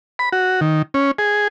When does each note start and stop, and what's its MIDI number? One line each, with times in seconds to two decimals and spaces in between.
0.19 0.29 83
0.32 0.61 66
0.61 0.82 51
0.94 1.11 61
1.18 1.48 68